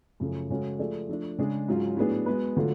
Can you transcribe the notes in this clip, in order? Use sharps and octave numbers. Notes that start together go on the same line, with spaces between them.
F#2 C#3 F3 A3
C#3 G#3 C#4 F#4 A4
F3 A3 F4 G#4 D5
F3 A3 D4
C#3 G#3 D4 G#4
G#2 F#3 C#4 F4
A2 F#3 B3 D4 G#4
G#3 B3 F#4 B4
D3 F#3 A3 F4